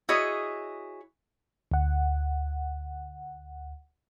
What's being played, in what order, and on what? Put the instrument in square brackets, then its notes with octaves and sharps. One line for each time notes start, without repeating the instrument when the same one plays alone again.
[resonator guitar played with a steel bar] E4 F#4 G#4 C#5 D#5
[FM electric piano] D2 F#5